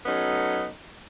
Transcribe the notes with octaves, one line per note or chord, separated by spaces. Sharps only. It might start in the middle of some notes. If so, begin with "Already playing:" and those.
F#3 A3 B3 C#4 D#4